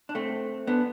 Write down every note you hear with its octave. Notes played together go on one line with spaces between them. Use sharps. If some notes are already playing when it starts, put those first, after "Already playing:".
D4
A3 C4
B3 D4